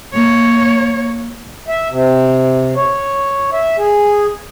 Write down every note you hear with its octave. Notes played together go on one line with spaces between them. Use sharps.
A#3 C#5
E5
C3
C#5
E5
G#4